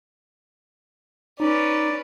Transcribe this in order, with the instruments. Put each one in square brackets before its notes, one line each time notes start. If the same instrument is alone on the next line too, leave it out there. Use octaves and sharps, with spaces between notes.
[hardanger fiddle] C#4 B4 [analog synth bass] D#4 [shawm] D5